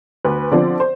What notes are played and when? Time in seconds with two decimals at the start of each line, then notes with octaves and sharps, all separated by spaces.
0.25 D2 B4
0.51 D3 F3 C4 D5
0.80 C5